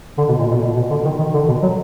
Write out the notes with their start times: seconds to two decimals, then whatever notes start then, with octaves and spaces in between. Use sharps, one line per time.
0.18 D3
0.28 B2
0.39 A#2
0.51 B2
0.61 A#2
0.76 B2
0.90 D3
1.05 D#3
1.19 D#3
1.34 D3
1.48 B2
1.62 F#3